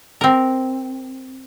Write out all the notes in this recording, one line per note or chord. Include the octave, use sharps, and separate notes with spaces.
C4 A#4